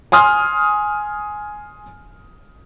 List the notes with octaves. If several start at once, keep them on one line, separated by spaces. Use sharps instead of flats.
G#5 C6 D#6 F6